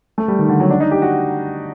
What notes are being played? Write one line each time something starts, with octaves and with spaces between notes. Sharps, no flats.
A3
G3
D#3
D3
F#3
D4
D#4
G4
F#4